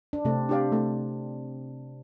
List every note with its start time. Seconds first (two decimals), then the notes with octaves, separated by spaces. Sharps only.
0.13 D4
0.25 C3 A3 C4
0.49 D4 G4 D5 F5
0.72 A3